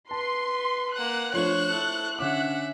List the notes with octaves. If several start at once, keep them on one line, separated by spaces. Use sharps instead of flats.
B4 A5 C6
A#3 F#5 F#6
F3 A3 D4 C5 C#5 C#6
E4 A4
D3 C#4 E5 F#5 D6